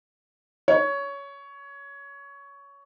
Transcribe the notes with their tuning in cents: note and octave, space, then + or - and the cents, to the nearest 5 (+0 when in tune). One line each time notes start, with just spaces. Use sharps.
C#5 +15